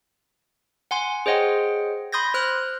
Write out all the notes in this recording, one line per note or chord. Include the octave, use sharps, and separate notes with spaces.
F#5 G#5 C6
G#4 C5 C#5 D#5 F#5 G5
B5 C6 D#6 G6 G#6 A#6
C5 F6 F#6